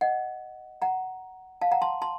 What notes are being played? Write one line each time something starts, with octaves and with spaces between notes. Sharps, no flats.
D#5 F#5
F#5 A#5
F5 A5
F#5 A#5
A5 C6
A5 C6